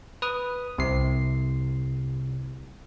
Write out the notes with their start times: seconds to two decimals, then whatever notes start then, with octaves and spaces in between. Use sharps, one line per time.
0.22 B4 D#6
0.78 C2 C3 C7